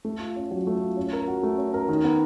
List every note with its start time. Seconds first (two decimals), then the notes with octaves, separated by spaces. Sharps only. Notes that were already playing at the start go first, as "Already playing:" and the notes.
0.05 A3
0.20 F4
0.36 C#4
0.51 F#3
0.67 A3
0.81 F4
0.97 C#4
1.13 A#4
1.28 F#4
1.43 A3
1.58 C#4
1.74 A#4
1.89 D#3
2.04 B3